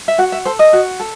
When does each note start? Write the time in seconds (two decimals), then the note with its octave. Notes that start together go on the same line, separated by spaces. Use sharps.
0.08 E5
0.18 F#4 F#5
0.32 E5
0.45 A4 C5
0.59 D#5
0.73 F#4
1.00 A4